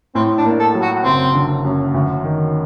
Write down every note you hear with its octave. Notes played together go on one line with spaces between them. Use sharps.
A2 C4
D4
A#3
A4
F#3
F#4
F#1 C4
D3
F#2
D2
D#3